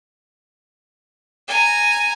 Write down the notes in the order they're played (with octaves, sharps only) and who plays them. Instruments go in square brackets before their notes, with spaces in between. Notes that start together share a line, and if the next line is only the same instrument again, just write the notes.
[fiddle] G#5 A#5